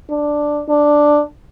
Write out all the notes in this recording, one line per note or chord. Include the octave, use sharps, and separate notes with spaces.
D4
D4